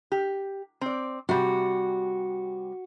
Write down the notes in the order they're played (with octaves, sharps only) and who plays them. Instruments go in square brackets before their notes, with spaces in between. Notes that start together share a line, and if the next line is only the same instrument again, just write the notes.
[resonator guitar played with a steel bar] G4
C4 D5
[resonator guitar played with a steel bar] C3 G3 [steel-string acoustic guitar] F#4